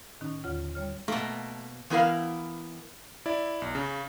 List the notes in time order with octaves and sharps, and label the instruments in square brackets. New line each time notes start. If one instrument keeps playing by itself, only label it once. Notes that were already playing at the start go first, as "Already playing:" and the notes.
[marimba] A2 D#3 C#4 D#4
D#2 D3 F4 C#5 F#5 F6
G3 C#5 F6
[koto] B2 A#3 [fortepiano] A3
[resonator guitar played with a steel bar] E3 B3 E4 A#4 F5
[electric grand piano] E4 D5
B1
C#3